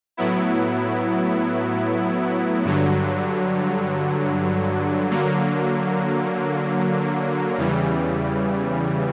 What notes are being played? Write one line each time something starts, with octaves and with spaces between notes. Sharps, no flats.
A2 F#3 B3 E4
G2 D3 F#3
D3 F#3 A#3
E2 C#3 E3 G3